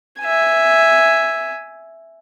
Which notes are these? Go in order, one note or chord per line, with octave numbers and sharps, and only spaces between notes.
E5 G#5